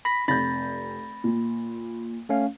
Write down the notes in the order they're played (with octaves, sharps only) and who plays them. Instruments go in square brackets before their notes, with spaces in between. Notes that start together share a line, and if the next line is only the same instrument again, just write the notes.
[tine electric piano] B5 A#6 B6
[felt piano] F1 G6 [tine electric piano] B5 A6 A#6
[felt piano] A#2
[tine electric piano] A3 C#4 F5